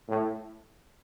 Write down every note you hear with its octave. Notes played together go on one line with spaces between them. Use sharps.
A2